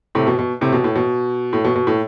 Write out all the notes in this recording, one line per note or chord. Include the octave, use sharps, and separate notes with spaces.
A2 C3
B2
B2
A2 C3
B2
A2
B2
A2
B2
B2
A2